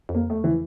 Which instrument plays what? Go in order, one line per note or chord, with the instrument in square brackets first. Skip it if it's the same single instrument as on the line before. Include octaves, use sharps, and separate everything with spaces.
[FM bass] F2
[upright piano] A#3
[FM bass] E2 [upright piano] A3
[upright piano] E3